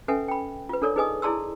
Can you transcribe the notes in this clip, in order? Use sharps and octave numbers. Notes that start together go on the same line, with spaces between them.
C#4 A4 B4 E5 F#5 G#5
G5 B5
F4 B4
D4 A4 A#4 C#5 D5
D#4 G#4 B4 D#5 G#5 D#6
E4 G#4 D5 A5 C6 E6